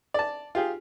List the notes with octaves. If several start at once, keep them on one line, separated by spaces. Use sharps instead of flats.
D5 A5
F4 G4 G#4